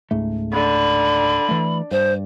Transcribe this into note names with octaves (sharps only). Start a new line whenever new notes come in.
C#2 G#2 A3
D3 B5
E3 A3
G2 C5